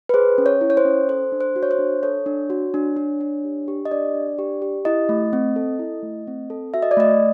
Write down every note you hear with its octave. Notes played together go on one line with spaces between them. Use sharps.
B4
G#4 C5
C#4
C#5
E4
C#5
C5
C#4
A4 C5
D4
C5
F#4
C#5
C5
D4
A4 C#5
D4
F#4
D4
D4
D4
G4
G4
D#5
D4 D5
D4
G4
G4
E4 D#5
A3
C4
A4
E4
A3
C4
A4
F#4 E5
D#5
D5
A3 D#5